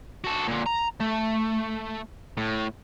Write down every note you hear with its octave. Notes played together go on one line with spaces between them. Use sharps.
F#4 A4
A#2 D3
A#5
A3
A2